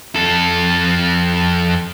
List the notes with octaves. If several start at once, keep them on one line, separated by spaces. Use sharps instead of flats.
F2 A4